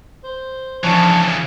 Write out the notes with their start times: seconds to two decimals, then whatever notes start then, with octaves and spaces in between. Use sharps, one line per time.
0.24 C5
0.84 C#3 E3 F3 D4 C#5